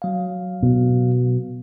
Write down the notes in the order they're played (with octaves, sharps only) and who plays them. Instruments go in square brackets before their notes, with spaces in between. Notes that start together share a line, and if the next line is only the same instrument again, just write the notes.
[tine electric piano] F#3 F5
[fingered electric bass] B2